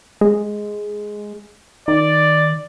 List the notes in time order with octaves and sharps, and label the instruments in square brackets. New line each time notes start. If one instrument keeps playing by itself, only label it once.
[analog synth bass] G#3
[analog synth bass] D#3 [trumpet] D5